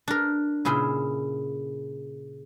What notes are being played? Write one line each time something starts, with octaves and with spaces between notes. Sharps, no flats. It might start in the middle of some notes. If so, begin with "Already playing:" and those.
D4 A#4
A#2 C#3 E4 G#4 C6